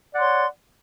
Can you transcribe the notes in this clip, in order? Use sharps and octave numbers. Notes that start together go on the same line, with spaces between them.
C#5 D5 F#5 C6